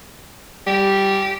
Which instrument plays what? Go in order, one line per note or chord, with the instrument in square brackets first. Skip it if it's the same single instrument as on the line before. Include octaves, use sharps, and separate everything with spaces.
[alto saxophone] G3 [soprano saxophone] G4